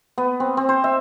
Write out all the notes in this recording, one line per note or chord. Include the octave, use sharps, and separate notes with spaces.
B3
C4
C4
C5
E5